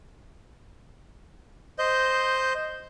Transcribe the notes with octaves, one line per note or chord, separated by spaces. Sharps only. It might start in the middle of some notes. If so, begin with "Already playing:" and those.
C5 D#5 G6